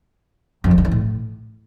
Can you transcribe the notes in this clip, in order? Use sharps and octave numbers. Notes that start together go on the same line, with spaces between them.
F2
F3
G2
E3
A2